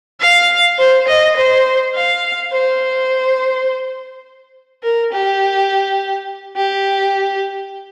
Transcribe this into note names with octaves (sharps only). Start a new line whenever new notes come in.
F5
C5
D#5
C5
F5
C5
A#4
G4
G4